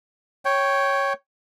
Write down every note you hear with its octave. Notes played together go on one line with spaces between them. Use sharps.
C#5 G5